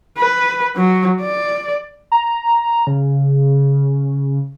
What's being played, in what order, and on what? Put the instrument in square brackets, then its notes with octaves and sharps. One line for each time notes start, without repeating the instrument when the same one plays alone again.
[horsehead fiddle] B4
F#3
D5
[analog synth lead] A#5
C#3